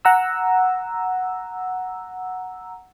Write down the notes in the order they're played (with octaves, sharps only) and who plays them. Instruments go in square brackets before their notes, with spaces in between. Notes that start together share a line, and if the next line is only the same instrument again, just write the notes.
[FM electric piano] F#5 A#5 E6